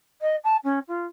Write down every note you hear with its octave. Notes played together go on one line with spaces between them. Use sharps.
D#5
A5
C#4
F4